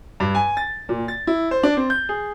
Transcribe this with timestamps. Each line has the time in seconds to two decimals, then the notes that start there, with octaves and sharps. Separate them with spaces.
0.20 G2
0.35 G#5
0.57 A6
0.89 A#2
1.08 A6
1.27 E4
1.51 C5
1.63 D4
1.77 C4
1.90 G6
2.09 G#4